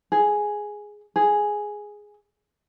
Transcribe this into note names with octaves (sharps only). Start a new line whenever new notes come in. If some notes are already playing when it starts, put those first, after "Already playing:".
G#4
G#4